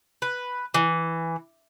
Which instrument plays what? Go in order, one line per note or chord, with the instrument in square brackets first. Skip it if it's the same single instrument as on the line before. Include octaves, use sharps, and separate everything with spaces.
[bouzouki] B4
E3